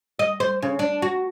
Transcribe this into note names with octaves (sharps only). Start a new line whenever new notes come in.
D#5
C5
C#3
D4
F#4